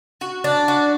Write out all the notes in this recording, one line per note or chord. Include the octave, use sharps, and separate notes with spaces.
F#4
D4
F#4